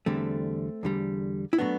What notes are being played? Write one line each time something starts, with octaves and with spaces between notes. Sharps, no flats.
E2 D3 G3 A3 C4
E2 D3 G3
E4
A2 F#3 A3 B3 D4